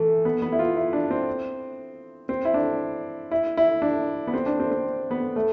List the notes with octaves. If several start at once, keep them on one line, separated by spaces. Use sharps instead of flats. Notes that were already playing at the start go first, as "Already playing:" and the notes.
Already playing: E3 A3
B3
B3
E4
F4
E4
D4
C4
C4
E4
D4
E4
E4
D4
B3
C4
D4
C4
C4
B3
A3